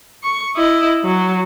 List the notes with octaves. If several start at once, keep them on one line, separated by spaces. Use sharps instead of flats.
C#6
E4 D#5
F#3